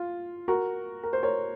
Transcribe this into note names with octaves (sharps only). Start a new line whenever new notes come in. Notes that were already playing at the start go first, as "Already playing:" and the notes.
Already playing: F4
F#4 A#4
A#4
C5
A#4 C#5